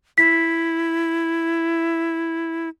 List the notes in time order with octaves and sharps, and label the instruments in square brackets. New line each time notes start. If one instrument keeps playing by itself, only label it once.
[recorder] E4 [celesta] B6